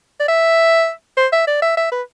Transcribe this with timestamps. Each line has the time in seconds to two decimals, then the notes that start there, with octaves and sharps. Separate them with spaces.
0.20 D5
0.28 E5
1.17 C5
1.32 E5
1.47 D5
1.62 E5
1.77 E5
1.92 B4